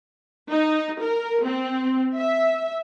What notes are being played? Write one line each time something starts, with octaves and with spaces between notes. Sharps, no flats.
D#4
A#4
C4
E5